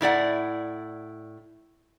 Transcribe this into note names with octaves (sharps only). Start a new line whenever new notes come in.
A2 E4 D5 F#5